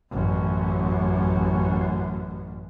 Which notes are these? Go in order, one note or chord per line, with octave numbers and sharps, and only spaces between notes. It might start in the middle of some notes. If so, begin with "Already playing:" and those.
A1 F#2